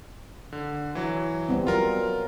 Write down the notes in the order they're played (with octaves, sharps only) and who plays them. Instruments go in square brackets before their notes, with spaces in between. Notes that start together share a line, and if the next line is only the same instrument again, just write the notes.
[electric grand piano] D3
E3 F#3
[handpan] G3 B3 C4
[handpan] F#3 [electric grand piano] F4 A#4